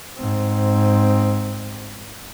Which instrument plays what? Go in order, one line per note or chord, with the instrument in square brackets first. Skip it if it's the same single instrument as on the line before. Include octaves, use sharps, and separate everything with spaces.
[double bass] G#2 C4